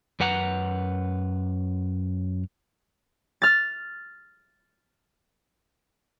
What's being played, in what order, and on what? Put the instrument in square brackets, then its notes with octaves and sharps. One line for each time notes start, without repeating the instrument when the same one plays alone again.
[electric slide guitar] F#2 B4 F#5 A#5
[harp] F6 A6